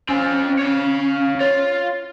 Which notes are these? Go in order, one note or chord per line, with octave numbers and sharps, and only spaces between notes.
C4 C#4 F4
C#5 F5
F4 C#5